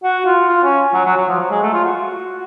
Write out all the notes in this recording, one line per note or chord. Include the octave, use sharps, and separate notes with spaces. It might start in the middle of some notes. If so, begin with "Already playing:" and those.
F#4
F4
F4
C#4
F#3
F#3
F#3
F3
F#3
G#3
A3
F4
F#4